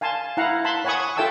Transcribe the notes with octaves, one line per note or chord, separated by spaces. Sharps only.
F5 G#5 A5 C6
E4 F5 F#5 A#5
A5 B5 C6
C#5 F#5 G#5 B5 C#6 D#6
F4 A4 E5 G5 A5 E6